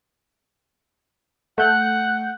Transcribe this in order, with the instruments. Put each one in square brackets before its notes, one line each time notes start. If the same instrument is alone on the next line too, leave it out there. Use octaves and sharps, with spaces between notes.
[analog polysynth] A3 G6 [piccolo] F#5